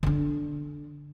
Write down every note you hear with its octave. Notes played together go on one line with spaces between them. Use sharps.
D3 D4